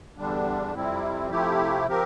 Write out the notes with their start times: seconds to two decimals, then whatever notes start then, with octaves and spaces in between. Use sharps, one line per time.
0.18 E2 D3 G3 D4
0.74 F2 C3 G3 C4 E4
1.30 C3 F3 A3 E4 G4
1.88 F3 C4 G4 A#4